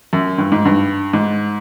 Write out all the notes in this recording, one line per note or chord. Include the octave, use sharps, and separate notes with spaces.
F#2
G2
G#2
G2
G#2